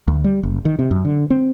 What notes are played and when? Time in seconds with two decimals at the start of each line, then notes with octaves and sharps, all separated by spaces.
0.08 D2
0.24 G3
0.43 F#1
0.65 D#3
0.79 C3
0.91 F#2
1.05 D3
1.30 C4